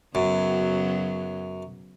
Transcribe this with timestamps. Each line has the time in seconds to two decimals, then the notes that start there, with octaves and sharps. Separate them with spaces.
0.15 F#2 C#3 F#3 B3